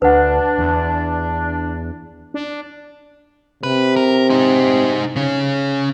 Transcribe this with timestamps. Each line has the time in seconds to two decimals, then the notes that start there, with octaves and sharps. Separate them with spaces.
0.02 D2 D4 B4 F#5
0.58 E2
2.34 D4
3.63 C3 B4
3.96 A#4
4.30 D#4 C5
5.16 C#3 C#4